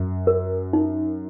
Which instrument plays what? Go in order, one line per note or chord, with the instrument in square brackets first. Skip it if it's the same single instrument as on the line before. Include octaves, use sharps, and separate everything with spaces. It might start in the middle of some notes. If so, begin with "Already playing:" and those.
Already playing: [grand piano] F#2
[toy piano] A#4
D#4